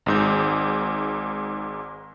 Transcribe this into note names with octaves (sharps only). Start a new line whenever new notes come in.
G#1 G#2 G6